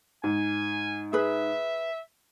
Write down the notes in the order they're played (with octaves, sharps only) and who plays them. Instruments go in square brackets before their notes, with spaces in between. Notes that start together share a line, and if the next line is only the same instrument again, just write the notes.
[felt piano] G#2 [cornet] G#5
[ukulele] G#4 B4 [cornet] E5